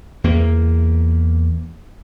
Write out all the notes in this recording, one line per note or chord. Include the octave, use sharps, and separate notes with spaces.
E2 A#3